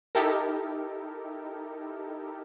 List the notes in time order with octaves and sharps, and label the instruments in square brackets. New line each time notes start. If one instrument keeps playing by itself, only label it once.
[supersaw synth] D#4 E4 G4 A4 A#4